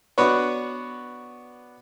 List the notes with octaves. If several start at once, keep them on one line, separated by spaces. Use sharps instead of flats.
B3 D4 F#4 B4 C#5